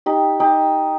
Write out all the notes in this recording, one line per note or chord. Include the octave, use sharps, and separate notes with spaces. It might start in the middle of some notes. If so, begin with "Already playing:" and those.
D#4 G4
D#4 G4